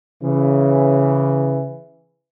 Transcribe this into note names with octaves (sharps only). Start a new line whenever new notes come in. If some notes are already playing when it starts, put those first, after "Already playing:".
C#3 E3